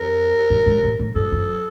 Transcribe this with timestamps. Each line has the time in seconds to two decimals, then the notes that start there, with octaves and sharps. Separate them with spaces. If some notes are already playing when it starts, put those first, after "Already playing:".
Already playing: F2 A#4
0.50 G#2
0.66 G#2
0.83 A2
0.99 A2
1.15 G2 A4
1.32 F#2